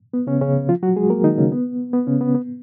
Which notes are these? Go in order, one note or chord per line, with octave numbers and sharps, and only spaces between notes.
B3
C#3 C#4
C#3 C#4
F3 F4
F#3 F#4
G#3 G#4
A#3 A#4
D#3 D#4
C#3 C#4
B3
B3
C#3 C#4
B3
B3